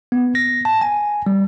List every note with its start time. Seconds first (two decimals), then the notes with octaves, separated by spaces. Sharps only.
0.12 B3
0.35 A#6
0.65 A5
0.81 G#5
1.27 G3